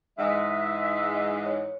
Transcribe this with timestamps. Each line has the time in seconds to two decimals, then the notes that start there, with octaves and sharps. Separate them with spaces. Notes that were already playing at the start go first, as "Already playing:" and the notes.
0.18 G#2 E3 G#3 E5 F#5 D#6
1.46 C#5